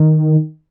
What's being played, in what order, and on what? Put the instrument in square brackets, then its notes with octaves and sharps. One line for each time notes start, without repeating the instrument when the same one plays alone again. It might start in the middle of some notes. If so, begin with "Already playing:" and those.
Already playing: [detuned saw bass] D#3